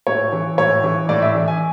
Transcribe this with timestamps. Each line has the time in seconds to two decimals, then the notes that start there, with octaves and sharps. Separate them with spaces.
0.07 A2 C#5
0.32 E3
0.58 A2 C#5
0.84 E3
1.09 A2 D5
1.22 E5
1.35 E3
1.48 G#5